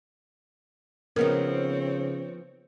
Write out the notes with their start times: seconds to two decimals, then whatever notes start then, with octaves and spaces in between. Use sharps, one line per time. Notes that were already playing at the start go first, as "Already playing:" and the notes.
1.16 C#3 F3 B3 C4 D#4 A#4 C#5